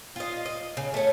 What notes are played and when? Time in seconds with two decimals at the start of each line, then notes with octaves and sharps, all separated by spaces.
0.16 F4 D#5
0.46 D#5
0.77 C#3
0.94 A3 C#4